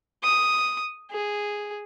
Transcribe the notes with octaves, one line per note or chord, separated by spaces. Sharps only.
D#6
G#4